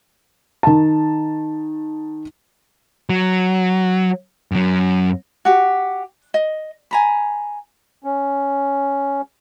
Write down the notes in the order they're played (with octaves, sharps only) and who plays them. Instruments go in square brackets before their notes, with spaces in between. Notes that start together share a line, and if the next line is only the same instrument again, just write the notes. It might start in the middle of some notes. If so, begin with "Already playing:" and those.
[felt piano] D#3 A5
[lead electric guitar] F#3
F#2 F#3
[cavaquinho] F#4 G4
D#5
G#5 A#5 B5
[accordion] C#4